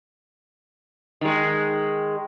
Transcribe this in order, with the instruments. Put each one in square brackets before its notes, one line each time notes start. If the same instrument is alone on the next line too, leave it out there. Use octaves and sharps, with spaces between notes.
[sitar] D#3 G#3